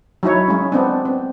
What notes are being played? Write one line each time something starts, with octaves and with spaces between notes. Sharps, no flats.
F#3 D#4 E4 C#5
G#3 C#4
B3 C4 D4
C4